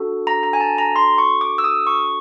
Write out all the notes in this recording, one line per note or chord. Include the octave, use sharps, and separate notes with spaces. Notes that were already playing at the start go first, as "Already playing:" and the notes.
Already playing: D4 F#4 A4
A#5
A#5
G#5
A5
A#5
C6
C#6
D6
E6
D#6
C#6